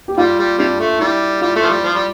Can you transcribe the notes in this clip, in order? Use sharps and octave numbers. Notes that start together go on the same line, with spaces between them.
G4
G3 F4
G3
C3 G3 D4
A3
G3 E4
G3 F4
A3
F3
G3
F3
G3